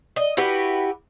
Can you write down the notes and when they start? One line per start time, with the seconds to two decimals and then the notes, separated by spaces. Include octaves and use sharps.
0.16 D#5
0.37 E4 F#4 G4 B4